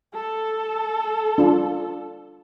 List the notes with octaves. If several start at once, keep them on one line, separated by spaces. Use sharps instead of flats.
A4
D4 F4